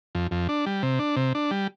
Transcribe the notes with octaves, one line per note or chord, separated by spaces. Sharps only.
F2
F2
D4
G3
C3
D4
C3
D4
G3